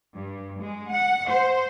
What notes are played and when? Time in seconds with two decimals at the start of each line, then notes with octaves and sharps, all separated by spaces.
0.13 G2
0.60 G#3
0.91 F#5
1.28 C5